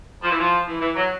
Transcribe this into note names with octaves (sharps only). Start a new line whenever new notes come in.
F3
E3
F3
E3
E3
F#3